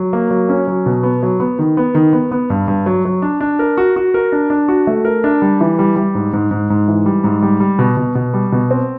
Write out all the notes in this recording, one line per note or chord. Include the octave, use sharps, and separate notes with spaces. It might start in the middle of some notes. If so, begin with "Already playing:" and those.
Already playing: F#3
A#3
F#3
C#4
F#3
B2
B3
F#3
B3
D#3
B3
D#3
B3
B3
G2
G2
F#3
F#3
D4
D4
A#4
F#4
F#4
A#4
D4
D4
F#4
A3
A#4
D4
G3
E3
G3
G3
G#2
G#2
G#2
G#2
E3
G3
G#2
G3
G3
B2
B2
B2
G3
B2
C4